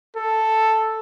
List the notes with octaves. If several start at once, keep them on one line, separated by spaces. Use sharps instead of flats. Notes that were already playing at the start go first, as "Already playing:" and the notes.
A4